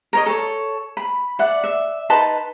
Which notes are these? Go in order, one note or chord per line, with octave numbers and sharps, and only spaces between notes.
A#4 C#5 D#5
A4 C#5
B5
D5 E5 F#5
E5
D#4 B4 A5 C6